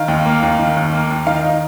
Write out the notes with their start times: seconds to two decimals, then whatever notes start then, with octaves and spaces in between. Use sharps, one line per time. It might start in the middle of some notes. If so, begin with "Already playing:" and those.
Already playing: D#3 F5
0.08 D#2
0.26 A#3
0.43 D#2
0.59 D#3
0.77 D#2
0.93 A#3
1.10 D#2
1.27 D#3 F5
1.44 D#4